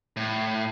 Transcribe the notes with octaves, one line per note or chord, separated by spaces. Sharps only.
A2